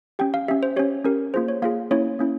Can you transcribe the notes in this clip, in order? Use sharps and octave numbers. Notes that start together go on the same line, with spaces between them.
C#4 G4 G5
F5
C#4 G4 E5
C5
C#4 G4 C#5
C#4 G4 A#4
A#3 F4 G#4 C5
C#5
A#3 F4 G#4 F5
A#3 C#4 E4 C#5
A#3 C#4 E4